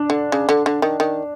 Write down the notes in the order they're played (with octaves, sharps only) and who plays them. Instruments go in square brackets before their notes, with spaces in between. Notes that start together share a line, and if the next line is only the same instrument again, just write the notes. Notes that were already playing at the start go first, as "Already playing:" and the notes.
Already playing: [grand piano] D4
[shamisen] D3
C#3
D3
D3
D#3
D#3